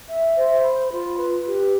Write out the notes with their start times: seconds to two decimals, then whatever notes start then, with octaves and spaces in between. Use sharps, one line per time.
0.09 E5
0.36 C5
0.63 B5
0.90 F4
1.17 B4
1.45 G4